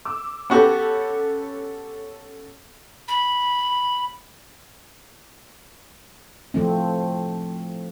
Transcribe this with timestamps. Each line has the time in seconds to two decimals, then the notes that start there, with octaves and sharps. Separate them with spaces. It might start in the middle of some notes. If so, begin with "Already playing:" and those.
0.05 D6 E6
0.50 B3 C#4 F#4 G4 A4
3.08 B5
6.54 F3 A3 C4